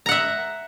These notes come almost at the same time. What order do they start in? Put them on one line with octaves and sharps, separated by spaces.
A#5 F#5 E5